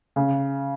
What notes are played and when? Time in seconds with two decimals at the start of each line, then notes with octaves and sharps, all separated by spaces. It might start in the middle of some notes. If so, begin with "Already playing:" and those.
0.16 C#3